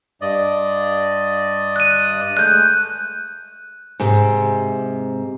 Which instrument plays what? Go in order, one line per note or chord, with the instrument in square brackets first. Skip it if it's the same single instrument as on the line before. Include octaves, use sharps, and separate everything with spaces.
[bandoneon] G2 D5 D#5
[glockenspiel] F#6 D#7
[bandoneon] G#3 A3 [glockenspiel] F#6 G6
[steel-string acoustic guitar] G#2 C3